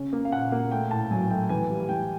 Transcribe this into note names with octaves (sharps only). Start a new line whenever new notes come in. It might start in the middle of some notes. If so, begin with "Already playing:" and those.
Already playing: C#3 C#4
A#3
F5
A#2 F#5
A#3
A3 G5
A2 A5
F#3 G#5
A3 G5
E3 G#5
G3
E3 G5